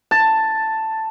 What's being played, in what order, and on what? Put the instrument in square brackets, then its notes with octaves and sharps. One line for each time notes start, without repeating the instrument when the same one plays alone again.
[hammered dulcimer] A5